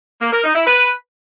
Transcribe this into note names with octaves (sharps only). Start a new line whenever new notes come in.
A#3
A#4
D#4
E4
B4